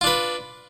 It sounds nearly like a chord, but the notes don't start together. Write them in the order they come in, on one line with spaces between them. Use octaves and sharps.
F4 D4 B4